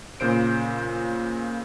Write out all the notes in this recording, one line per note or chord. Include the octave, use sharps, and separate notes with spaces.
A#2 C#3 C5 D7